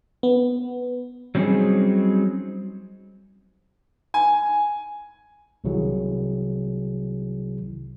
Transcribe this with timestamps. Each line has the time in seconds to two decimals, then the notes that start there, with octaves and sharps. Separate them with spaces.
0.23 B3
1.35 F#3 G3 C4 C#4 D#4 G#4
4.14 G#5
5.64 C2 C3 D#3 F#3 E4 G#4